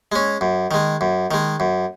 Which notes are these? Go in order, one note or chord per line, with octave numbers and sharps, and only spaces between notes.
G#3 C#4
F#2
D#3 G#3
F#2
D#3 G#3
F#2